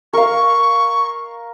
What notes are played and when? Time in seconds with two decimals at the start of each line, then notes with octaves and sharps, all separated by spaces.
0.13 A#4 F5 C#6